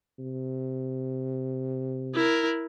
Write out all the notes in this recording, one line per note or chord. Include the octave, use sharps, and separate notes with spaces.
C3
E4 A#4